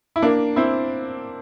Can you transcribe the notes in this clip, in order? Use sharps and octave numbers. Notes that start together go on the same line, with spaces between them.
E4
A#3 D4
C4 E4